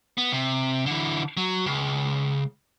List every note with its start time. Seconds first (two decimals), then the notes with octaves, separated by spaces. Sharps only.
0.18 B3
0.32 C3
0.86 D3 E3
1.37 F#3
1.66 C#2